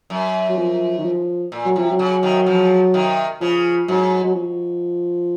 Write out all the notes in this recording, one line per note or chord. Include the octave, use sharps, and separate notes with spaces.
F#2
F#3
F3
D#3
F3
A#2
F#3
C3 F3
F#3
C#3
C3 D#3
C#3 F3
C3 D#3
C#3 F3
G#2 F#3
F#3
F3